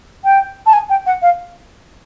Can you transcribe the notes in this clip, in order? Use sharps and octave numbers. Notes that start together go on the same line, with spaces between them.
G5
A5
G#5
G5
F#5
F5